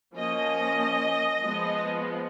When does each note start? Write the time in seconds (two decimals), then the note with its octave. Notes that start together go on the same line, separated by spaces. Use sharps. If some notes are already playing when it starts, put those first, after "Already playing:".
0.17 F3 A#3 C#4 D#5
1.42 F3 G#3 B3